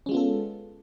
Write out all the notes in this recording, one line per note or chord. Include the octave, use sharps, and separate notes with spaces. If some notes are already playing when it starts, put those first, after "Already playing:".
G#3 B3 C#4 F4 A4